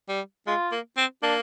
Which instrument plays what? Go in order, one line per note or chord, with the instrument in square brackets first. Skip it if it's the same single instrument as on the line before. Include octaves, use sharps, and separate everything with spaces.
[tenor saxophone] G3
[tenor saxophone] G#3 [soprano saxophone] F4
[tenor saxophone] A#3
C4
[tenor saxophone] A#3 [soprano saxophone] D4